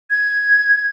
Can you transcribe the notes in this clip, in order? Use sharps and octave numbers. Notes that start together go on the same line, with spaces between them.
G#6